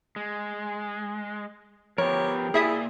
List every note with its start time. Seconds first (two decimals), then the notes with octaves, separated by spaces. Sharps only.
0.16 G#3
1.98 F3 B3 G4 A#4 C#5
2.54 A#3 E4 G#4 D5 E5 G#5 D#6